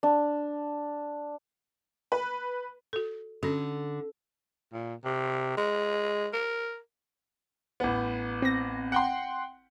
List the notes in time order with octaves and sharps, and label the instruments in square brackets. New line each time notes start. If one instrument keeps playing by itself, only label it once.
[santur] D4
[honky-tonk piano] B4
[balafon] F#4 A4
[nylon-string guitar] D3 [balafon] C#4 F#4
[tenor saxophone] A#2
C3
G#3
A#4
[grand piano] A1 B3
[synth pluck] C4 A#6
[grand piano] F#5 G5 C6